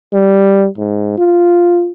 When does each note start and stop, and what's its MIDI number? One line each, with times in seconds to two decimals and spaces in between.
0.13 0.67 55
0.77 1.14 44
1.18 1.92 65